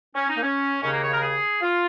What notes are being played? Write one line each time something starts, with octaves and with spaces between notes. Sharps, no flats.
C#4
D#4
A#3
C#4
D#2 C#3 C#4
A#3
C#5
A#4
G#4
F4